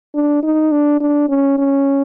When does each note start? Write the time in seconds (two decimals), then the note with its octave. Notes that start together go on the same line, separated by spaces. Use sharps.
0.15 D4
0.43 D#4
0.71 D4
1.00 D4
1.29 C#4
1.58 C#4